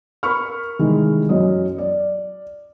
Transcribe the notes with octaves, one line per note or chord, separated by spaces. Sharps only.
A#4 B5 C#6 F6
C3 D#3 E3 G3 G#3
F#2 C#4 D#5
D5